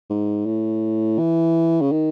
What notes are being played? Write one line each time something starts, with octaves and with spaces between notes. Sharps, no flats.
G#2
A2
E3
C#3
D#3